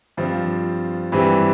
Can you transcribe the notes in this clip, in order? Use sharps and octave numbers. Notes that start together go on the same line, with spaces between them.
G2 F3 C4 F4
G2 E3 G3 C4